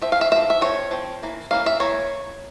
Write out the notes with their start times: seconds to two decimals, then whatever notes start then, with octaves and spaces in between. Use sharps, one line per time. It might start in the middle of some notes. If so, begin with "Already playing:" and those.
0.02 F3 C4 E5
0.12 F5
0.21 E5
0.31 F3 C4 E5
0.50 E5
0.61 F3 C4 C#5
0.91 F3 C4
1.23 E3 A#3
1.51 E3 A#3 C#4 F5
1.66 E5
1.80 E3 A#3 C#5